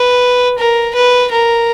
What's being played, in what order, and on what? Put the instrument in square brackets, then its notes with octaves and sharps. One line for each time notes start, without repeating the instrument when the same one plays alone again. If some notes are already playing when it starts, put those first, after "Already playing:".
Already playing: [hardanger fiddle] B4
A#4
B4
A#4